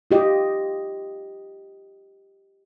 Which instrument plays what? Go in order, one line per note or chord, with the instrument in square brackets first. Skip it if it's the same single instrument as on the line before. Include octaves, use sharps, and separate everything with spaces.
[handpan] F4 G4 D#5